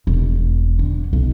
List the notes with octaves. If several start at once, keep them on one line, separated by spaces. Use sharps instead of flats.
E1
D3
B1